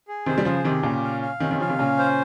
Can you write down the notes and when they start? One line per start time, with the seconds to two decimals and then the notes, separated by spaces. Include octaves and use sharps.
0.08 G#4
0.26 C3 D#3 C5
0.38 G3
0.45 C#3 F3 G#4
0.64 C3 D#3 G4
0.83 A#2 C#3 C#4
1.03 F5
1.22 F5
1.40 C3 D#3 C#4
1.51 C3 D#3
1.60 C#3 F3 F5
1.70 C3 D#3
1.78 A#2 C#3 C#4
1.99 C5